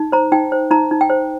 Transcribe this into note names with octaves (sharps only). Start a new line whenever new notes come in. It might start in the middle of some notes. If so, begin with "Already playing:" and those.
Already playing: D#4
C5 A#5
D#4 G5
C5
D#4 A#5
D#4
G5
C5